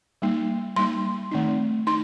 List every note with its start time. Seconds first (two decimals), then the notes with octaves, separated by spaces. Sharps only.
0.22 G3 A#3 D#4
0.76 G3 A#3 D#4 C6
1.31 D#3 A3 C4 D#4
1.87 D#4 C6